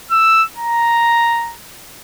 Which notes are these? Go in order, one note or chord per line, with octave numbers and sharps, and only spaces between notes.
E6
A#5